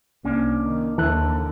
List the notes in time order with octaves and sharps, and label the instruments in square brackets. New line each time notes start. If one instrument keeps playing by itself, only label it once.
[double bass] C2 [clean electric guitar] A#3 C#4 D4
[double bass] D#3
[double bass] D#2 D3 [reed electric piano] E3 F#6 [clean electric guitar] A4